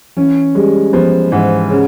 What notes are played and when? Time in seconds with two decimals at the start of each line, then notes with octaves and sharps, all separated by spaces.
0.17 E3 C#4
0.55 G3 G#3
0.93 F3 B3
1.32 G#2 E3
1.70 C#3